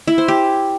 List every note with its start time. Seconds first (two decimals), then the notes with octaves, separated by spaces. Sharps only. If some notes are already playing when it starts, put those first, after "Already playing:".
0.08 E4
0.18 C5
0.28 G4